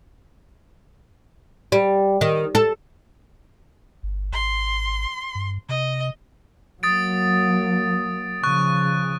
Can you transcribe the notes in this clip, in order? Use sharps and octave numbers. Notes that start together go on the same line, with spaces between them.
G3
D#3
A4
G1
G#1 C6
G2
C3 D#5
F#3 A#3 D#6 A6 D7
C#3 F3 C#6 F#6